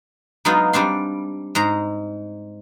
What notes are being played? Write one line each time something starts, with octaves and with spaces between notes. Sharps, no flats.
F#3 G#3 B3 D#4 F4
G3 C4 D4 C6
G#2 G#3 A#5